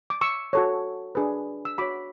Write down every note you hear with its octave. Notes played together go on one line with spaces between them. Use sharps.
D6
C#6 E6
F#4 A4 C#5
D4 G#4 B4
E6
F#4 C#5 B5 D6